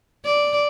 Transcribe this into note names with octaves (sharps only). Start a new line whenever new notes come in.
D5